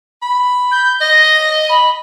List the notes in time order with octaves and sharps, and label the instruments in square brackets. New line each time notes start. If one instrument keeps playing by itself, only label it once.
[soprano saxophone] B5
[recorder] G6
[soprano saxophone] D#5 [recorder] A#6
[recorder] B5